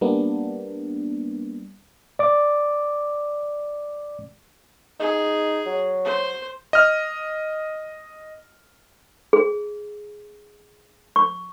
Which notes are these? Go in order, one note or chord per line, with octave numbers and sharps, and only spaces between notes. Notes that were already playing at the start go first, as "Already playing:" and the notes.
G3 A#3 B3 D4
D5 D6
D#4 G#4
F#3
C5
D#5 F6
G#4
C#6